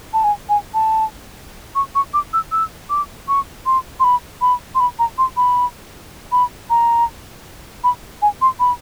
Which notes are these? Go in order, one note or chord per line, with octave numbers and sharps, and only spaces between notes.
A5
G#5
G#5
A5
C#6
C#6
D6
E6
E6
D6
C#6
C6
C6
B5
B5
C6
B5
A#5
C6
B5
B5
A#5
B5
G#5
C6
B5